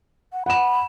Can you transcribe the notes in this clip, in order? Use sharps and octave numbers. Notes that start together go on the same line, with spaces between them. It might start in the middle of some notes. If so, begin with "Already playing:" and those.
F#5
F#5 B5 E7